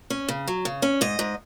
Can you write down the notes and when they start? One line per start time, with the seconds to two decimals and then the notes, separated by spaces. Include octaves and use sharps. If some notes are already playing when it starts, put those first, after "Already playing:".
0.10 C#4
0.28 C#3
0.48 F#3
0.65 C#3
0.82 C#4
1.01 G#2 D#5
1.19 G#2